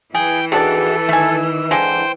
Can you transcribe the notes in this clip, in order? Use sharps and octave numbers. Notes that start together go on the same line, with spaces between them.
E3 G#4 G5
D#3 D4 F#4 G#4 A4 D5
D#3 A3 G#5 E6
D3 G#3 C5 G5